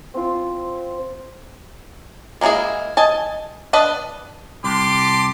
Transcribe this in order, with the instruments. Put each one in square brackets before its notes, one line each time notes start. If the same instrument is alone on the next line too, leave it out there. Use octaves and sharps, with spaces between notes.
[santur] C4 F4
[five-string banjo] G#3 A#3 D#4 E4 G#4
D#5 G#5 A5
D4 B4 D#5 A5
[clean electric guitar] C2 [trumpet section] G4 A5 D6 [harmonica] C6